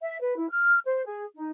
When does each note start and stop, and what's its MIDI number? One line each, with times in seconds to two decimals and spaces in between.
0.03 0.19 76
0.21 0.36 71
0.37 0.49 64
0.49 0.79 89
0.85 1.04 72
1.05 1.25 68
1.35 1.50 63